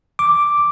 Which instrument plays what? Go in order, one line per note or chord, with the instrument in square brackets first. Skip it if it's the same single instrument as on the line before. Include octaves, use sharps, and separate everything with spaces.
[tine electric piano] D6